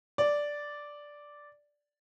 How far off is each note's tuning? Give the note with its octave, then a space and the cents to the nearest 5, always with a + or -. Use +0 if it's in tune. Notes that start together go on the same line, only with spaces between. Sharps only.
D5 -5